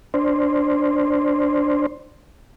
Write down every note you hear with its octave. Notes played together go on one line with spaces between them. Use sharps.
D4 C5